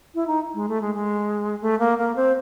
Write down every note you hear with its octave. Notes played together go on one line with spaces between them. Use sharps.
E4
D#4
G#3
A3
G#3
G#3
A3
A#3
A#3
C4